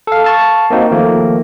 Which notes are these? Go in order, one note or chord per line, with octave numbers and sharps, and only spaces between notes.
A4 F5
F5 A5 C#6
A#3 C4 D#4 F#4
D#3 F3 A3 A#3